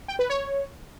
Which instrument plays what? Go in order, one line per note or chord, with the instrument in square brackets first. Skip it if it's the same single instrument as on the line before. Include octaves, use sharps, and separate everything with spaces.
[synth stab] G5
B4
C#5